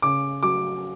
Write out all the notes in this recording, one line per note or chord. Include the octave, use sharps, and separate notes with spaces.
C#3 D6
F#3 D6